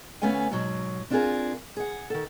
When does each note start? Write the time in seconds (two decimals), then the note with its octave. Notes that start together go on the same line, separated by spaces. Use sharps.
0.22 D2 A3 B3 C#4 F5 G#5
0.50 G#2 B2 F#3
1.10 C4 D4 F4 F#4 G#4 A#4
1.77 G#4 F#5
2.10 D#3 A4